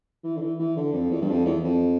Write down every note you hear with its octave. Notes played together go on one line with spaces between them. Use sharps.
E3
D3
E3
E3
D3
F2
E2
G2
F2
E2
F2